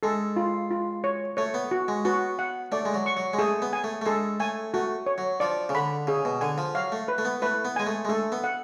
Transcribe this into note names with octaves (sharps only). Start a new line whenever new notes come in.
G#3 A4
F4
F4
C#5
A3 C#5
B3
F#4
G#3
B3 F#4
F#5
A3 D5
G#3
F#3
C#6
F#3
G#3
A3 G#4
B3
G#5
A3
A3
G#3 A4
A3 G#5
A3 F#4
C#5
F#3
F3 D5
C#3
D3 B5
C#3 G#4
B2
D3 G#5
F3
F#3 F5
A3
B4
A3
B3
A3 B4
B3
G#3 G#5
A3
G#3
A3 A4
B3
F#5